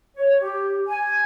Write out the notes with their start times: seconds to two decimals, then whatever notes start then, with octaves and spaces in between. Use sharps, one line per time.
0.16 C#5
0.42 G4
0.88 G#5